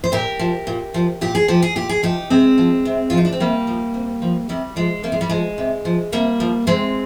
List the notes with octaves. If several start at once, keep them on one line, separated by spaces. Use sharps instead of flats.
C5
A#2 G4 A#4
F3
A#2
F3
A#2 G4
G#4
F3 G4
G#4
A#2 G4
G#4
F3 D#4 G4
C3 G#3 C4
F3
C3
F4
F3 D#4
D4
C4
C3 G3 A#3
F3
C3
F3
C3 G3
F3 G#3
C3 A#3
G#3
G3
F3 G#3
C3
F3
C3 G3 A#3
F3
C3 G#3 C4